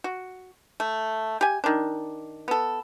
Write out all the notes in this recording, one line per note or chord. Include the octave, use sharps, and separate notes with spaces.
F#4
A3
G4 G#5
D#3 D4
B3 A4